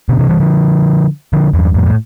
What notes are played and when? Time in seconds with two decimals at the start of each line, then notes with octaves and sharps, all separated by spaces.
0.09 B2 D3
0.19 C3 E3
0.29 E3 G3
0.40 D3 F3
1.33 D3 F3
1.54 E2 G2
1.74 F2 A2
1.86 A2